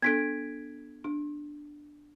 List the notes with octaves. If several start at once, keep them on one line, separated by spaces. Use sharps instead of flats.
B3 D4 A4 G#6 B6 D7
D4